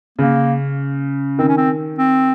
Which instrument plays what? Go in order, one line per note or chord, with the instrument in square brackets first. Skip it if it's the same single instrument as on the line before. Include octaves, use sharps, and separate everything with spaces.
[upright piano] C#3 [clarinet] A#3
[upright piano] D#3 [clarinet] C4
[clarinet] C#4
C4
C4